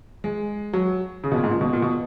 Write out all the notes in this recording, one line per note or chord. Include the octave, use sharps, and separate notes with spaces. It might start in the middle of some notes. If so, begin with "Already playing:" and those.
G#3
F#3
C#3
B2
A#2
G#2
A#2
B2
A#2
B2